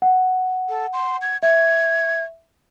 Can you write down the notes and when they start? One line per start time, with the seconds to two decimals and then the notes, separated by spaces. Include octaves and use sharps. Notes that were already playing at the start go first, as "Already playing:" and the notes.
0.02 F#5
0.69 A4
0.93 C6
1.21 G#6
1.43 E5 G#6